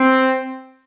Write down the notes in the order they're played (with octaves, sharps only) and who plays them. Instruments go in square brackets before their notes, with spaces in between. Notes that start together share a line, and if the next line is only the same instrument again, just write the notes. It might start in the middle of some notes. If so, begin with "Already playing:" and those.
Already playing: [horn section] C4